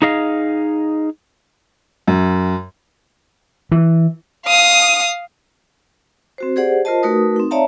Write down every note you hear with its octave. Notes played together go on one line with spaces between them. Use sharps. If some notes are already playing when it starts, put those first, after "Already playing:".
D#4 G#4 D#5 F5
F#2
E3
F5 D#6
C4 F#4 C5
G4 G#4 C5 D5 F#5
F4 A#4 C5 D#5 A5
A3 D#4 F#4 A#4 B4 D#6
C4 D#4
C#5 D5 E5 F5 A5 A#5